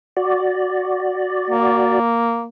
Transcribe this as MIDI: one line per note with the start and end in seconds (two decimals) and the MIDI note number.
0.17 1.99 66
0.17 1.99 74
1.50 2.47 58